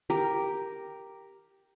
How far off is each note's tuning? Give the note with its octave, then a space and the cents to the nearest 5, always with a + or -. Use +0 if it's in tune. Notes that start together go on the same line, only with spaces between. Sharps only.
G4 +0 A#4 +0